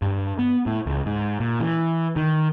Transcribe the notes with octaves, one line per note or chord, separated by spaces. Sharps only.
G2
B3
A2
C#2
G#2
A#2
E3
D#3